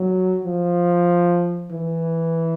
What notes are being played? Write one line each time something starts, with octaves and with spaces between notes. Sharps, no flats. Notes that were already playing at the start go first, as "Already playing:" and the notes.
Already playing: F#3
F3
E3